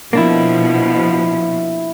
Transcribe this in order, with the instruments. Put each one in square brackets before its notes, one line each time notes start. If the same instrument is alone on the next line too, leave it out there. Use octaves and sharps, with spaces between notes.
[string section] B2 F3 [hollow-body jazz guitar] A#3 D4 E4